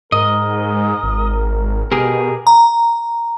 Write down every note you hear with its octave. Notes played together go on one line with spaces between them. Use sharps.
G#2 A#4 D#5
G#1
B2 G4 G#4 A#4
A#5